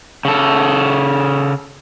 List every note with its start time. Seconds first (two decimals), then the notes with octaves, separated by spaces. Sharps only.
0.25 C#3 A4